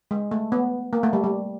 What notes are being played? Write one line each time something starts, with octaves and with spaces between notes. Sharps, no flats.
G#3
A3
B3
A#3
A3
G3
G3